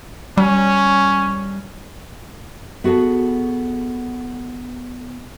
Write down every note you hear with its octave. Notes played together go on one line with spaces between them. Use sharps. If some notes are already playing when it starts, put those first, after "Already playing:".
G3 C#4
B3 F#4 G#4 A4